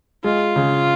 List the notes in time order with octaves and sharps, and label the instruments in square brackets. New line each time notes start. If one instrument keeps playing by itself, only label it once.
[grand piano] G#3 [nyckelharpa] F4
[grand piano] C#3